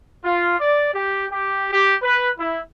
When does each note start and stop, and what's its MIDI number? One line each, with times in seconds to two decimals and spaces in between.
0.24 0.58 65
0.59 0.89 74
0.94 1.26 67
1.31 1.67 67
1.73 1.94 67
2.02 2.30 71
2.38 2.61 64